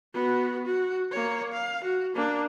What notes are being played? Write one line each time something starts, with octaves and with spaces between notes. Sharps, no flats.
B3 F#4
F#4
A#3 C#5
F5
F#4
A#3 D4